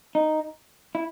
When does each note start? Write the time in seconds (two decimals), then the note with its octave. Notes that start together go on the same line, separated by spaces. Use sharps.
0.15 D#4
0.95 E4